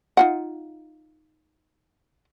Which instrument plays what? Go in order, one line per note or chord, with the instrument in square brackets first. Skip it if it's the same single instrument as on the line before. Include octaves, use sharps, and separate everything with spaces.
[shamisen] D#4 F4 F#5